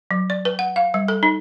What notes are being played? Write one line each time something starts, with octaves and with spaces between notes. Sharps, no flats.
F#3
D5
B4
F#5
F5
G3
A4
D#4